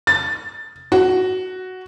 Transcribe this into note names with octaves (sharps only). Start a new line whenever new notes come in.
A6
F#4